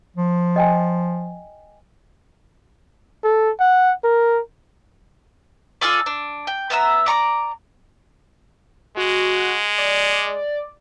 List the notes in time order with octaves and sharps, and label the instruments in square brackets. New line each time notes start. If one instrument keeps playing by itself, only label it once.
[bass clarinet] F3
[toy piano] D#5 G5 G#5
[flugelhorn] A4
F#5
A#4
[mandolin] F4 G#4 A4 D5
D4
G5
B3 E5 A#5 E6
D5 A#5 C#6 D6
[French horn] G#3 [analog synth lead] F#4
[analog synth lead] D5